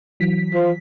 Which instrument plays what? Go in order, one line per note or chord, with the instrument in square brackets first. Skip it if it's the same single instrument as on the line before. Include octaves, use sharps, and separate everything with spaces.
[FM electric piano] E3 F#3 B6
[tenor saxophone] F3